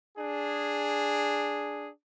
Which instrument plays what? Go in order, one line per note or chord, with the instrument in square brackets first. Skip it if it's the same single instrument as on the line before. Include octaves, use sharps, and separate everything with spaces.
[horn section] D4 G#4